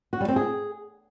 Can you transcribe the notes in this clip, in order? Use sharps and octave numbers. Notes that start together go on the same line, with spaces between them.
F#4
G3
C4
G#4